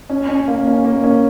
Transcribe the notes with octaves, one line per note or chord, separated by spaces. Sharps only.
C#4
C#4
A#3
C#4
A#3
C#4